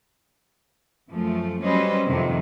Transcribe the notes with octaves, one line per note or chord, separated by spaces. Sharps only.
F#2 F3 A3
F#3 G3 C#4 B4 C5 D#5
F2 C3 D#3